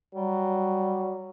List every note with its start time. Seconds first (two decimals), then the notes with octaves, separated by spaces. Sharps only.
0.15 F#3 G3